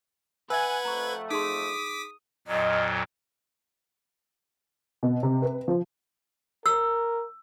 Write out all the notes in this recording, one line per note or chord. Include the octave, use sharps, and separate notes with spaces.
B4 E5 F#5 G#5 E6 G#6
F2 A3 A#5 C#6
D#4 G#4 C6 D6 D#6 B6
F2 A#2 F#3 D#5
B2
C3
B4
F3
A#4 E6